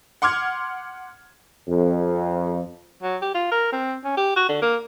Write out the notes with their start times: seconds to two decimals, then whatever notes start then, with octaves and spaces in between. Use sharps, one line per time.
0.22 F#5 C6 D6 F6 G#6
1.69 F2
3.03 F#3
3.22 G4
3.34 F4
3.52 A#4
3.72 C4
4.05 C#4
4.17 G4
4.36 F#4
4.49 D3
4.62 A#3